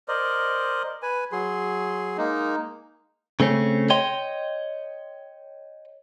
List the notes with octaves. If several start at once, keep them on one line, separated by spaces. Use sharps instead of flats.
A#4 C5 D5 D#5
B4 G#5
F#3 G#4 C6
G#3 A#3 D#4
C#3 A3 C4 C#4
C#5 D#5 G5 C6